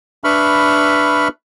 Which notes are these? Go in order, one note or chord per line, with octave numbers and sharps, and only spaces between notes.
D4 B4 E5 B5 C#6 F6